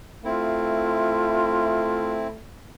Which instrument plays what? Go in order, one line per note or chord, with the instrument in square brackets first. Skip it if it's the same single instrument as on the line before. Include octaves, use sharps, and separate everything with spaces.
[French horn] A3 [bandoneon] C4 E4 [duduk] F4